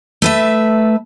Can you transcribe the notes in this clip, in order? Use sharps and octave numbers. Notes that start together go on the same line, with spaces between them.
A3 B4 E5